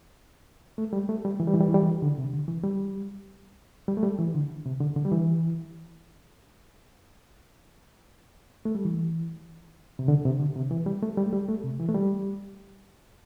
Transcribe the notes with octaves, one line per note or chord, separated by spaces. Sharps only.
A3
G3
A3
G3
E3
G3
E3
G3
E3
G3
E3
D3
C3
D3
E3
G3
G3
A3
G3
E3
D3
C3
D3
D3
G3
E3
A3
G3
E3
C3
D3
C3
D3
C3
E3
G3
A3
G3
A3
G3
A3
C3
E3
A3
G3